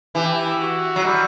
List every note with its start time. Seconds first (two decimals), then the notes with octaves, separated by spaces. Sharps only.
0.15 E3 G4
0.60 F#4
0.96 F#3
1.05 G3